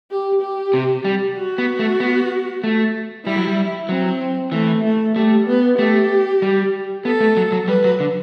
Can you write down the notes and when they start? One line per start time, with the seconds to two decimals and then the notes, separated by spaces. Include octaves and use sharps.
0.11 G4
0.42 G4
0.74 C3
1.05 G3
1.36 F#4
1.58 B3
1.79 A3
2.00 B3
2.64 A3
3.26 G3 E4
3.36 F#3
3.47 G3
3.89 F#3 C4
4.52 E3 A3
4.83 A3
5.16 G3 A3
5.47 B3
5.78 A3 G4
6.42 G3
7.05 B3 A4
7.20 A3
7.37 F#3
7.52 F#3
7.68 G3 B4
7.84 F#3
8.00 D3